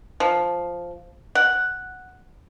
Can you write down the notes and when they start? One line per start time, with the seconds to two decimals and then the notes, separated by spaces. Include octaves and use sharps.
0.20 F3
1.35 F#5